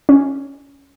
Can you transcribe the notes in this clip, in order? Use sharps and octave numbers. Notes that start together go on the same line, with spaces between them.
C#4